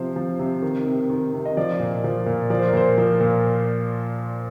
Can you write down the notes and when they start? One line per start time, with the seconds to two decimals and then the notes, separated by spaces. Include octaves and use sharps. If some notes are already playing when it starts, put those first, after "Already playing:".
Already playing: C3 F3 C5
0.16 F3
0.39 C3
0.62 D#3
0.86 C3
1.10 D#3
1.33 C3
1.46 D#5
1.57 F3 D5
1.79 A#2
2.04 F3
2.26 A#2
2.50 F3 D5
2.59 C5
2.68 A#4
2.73 A#2 C5
2.98 F3
3.20 A#2